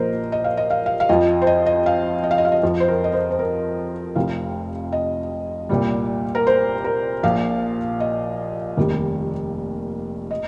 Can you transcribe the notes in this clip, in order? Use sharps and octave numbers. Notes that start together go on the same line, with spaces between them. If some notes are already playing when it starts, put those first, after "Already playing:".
Already playing: A#1 A#2 F3 A#4 C5 D#5
D#5
F5
D#5
F5
F5
F5
F2 F3 D#5
C5
D#5
D#5
F5
D#5
F5
D#5
F5
D#5
F2 F3
C5
A#4
D#5
C5
C5
A#4
F1 F2 C3 F5
D#5
C2 A#2 G3
A#4
C5
A#4
A#1 A#2 F3 F5
D#5
F1 D#2 D#3 G3
D#5